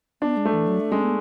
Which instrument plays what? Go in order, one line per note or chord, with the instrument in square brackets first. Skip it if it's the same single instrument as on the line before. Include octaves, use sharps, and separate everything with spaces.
[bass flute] B3 [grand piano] D4
[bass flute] G#3
[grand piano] A3
[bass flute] E3
F#3
A3
[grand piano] G#3 [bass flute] C#4
[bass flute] B3